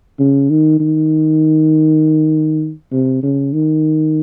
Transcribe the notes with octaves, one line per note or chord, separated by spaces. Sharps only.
C#3
D#3
D#3
C3
C#3
D#3